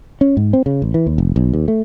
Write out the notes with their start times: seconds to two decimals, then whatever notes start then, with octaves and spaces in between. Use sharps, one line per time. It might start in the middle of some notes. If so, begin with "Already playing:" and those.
0.21 C#4
0.37 G#2
0.53 C4
0.66 C#3
0.82 A1
0.94 E3
1.07 D#2
1.18 F1
1.36 B1
1.53 D#2
1.68 A3